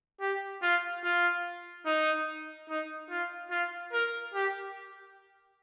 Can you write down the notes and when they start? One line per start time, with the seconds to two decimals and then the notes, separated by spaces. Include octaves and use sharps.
0.21 G4
0.62 F4
1.04 F4
1.86 D#4
2.69 D#4
3.10 F4
3.51 F4
3.93 A#4
4.34 G4